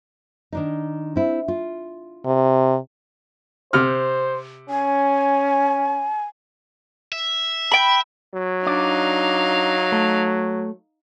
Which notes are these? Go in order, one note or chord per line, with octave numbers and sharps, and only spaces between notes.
D#3 D4 D#4
C4 E4
F4
C3
C3 C5 F6
C#4 G#5
E5
G5 B5
F#3
D4 D#4 D5 F5
A3